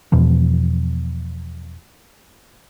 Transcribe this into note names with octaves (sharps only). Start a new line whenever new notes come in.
E2 B2 F3